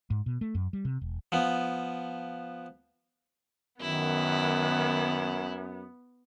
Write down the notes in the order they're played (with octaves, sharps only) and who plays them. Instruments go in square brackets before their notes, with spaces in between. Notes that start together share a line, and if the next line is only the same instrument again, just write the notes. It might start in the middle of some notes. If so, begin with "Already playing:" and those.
[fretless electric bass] G#2
B2
A3
F#2
G3
C3
E1
[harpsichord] F3 B3
[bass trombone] F#2 [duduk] D#3 [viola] B3 [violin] E4